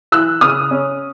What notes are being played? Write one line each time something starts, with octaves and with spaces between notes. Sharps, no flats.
E3 E6 F#6
C#3 D#6 F6
C#4